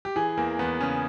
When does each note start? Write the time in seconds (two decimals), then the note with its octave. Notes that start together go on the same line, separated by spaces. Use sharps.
0.05 G4
0.16 E3 G#4
0.37 E2 A#3
0.59 E2 B3
0.80 C#3 C#4